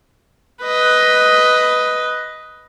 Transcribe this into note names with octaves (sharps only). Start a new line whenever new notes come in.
B4 D#5